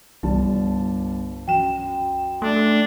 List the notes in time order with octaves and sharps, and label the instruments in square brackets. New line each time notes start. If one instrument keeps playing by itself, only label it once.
[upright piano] G1 G3 A5 [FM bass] C2
[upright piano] F#2 E7 [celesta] G5
[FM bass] A3 [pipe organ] D4